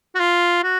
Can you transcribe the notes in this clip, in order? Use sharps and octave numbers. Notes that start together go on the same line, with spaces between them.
F#4
F4
F#4